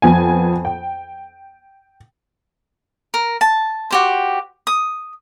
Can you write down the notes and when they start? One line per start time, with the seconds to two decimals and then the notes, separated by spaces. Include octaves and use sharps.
0.02 F2 B3 G#5
0.65 G5
3.14 A#4
3.41 A5
3.91 F#4 G4 C5
4.67 D#6